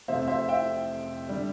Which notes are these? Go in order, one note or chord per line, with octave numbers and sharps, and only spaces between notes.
F1 F2 C3 C5 E5
C5 E5
E5 G5
D3 G3